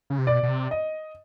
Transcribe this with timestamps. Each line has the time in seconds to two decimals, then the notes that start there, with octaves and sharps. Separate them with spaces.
0.10 C#3
0.19 C3
0.27 B2 D5
0.43 B2
0.48 C3
0.71 D#5